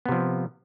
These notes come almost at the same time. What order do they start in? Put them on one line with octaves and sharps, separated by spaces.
B3 C3 F3